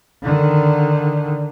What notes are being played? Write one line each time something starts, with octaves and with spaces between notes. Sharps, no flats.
D3 D#3